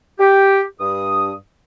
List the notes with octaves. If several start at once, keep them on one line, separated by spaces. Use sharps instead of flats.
G4
G2 D#6